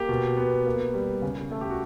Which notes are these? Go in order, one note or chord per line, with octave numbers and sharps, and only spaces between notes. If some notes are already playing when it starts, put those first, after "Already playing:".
Already playing: A#3 G4
B2
B3
A#3
G3
C#3
A3
G4
F#4